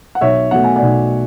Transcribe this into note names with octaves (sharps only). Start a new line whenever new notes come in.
F#5
B1 C#5 E5
B2 F#3 A3 F#5
G#5
D5 F#5
B1